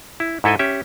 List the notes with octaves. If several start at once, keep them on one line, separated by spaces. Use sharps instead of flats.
E4
G#2 E4 A4 D#5 G#5
C#4 G4 E5